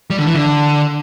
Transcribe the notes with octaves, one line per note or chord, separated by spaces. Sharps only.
G3
D3
E3
D3